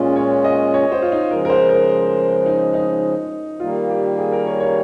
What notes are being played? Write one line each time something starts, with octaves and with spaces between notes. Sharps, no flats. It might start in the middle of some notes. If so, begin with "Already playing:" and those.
Already playing: A#2 G#3 C#4 F4
C#5
D#5
C#5
C5
F4
D#4
C#3 F3 G#3 A#4
A#4
C5
A#4
D#4
D#4
D#3 G3 A#3 F4
G4
G#4
A#4
C#5
C#5